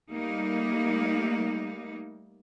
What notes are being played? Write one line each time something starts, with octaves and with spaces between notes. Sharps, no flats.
G3 A3 A#3 D#4